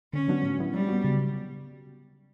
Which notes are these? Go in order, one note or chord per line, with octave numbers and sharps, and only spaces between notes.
D3 C#4
F#3 B3 D4 F#4
A2
F#3 B3 E4
F#3 G3
B3 F#4
C#3